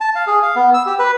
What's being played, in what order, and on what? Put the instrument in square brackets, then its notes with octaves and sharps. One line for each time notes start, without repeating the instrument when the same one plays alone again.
[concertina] A5
F5
G#4
F5
B3
E6
G4
B4